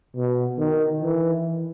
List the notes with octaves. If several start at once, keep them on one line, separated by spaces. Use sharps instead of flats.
B2
D#3
E3